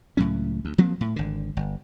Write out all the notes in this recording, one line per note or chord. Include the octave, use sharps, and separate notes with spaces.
C#2 A2 F#3 C#4
D2
F3 F#3 A#3 C4
A2
G#1 D3
G1